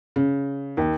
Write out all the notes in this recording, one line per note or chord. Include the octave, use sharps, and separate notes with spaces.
C#3
D#2